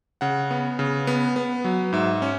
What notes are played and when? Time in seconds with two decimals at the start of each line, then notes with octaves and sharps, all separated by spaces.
0.21 C#3 F#5
0.51 B3
0.79 C#3
1.07 B3
1.36 B3
1.64 F#3
1.93 G#2 E5
2.22 C#4